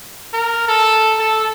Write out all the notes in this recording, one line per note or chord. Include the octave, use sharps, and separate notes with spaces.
A#4
A4
A4